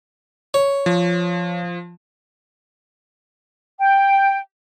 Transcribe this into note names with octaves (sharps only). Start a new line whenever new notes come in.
C#5
F3
G5